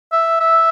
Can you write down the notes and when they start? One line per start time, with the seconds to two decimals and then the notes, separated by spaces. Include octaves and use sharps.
0.12 E5
0.40 E5